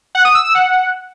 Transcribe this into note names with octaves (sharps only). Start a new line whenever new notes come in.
F#5
D#6
E6
E6
F#5